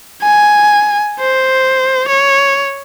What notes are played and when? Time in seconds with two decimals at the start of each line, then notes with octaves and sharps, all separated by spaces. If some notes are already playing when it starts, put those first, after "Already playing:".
0.23 G#5
1.20 C5
2.08 C#5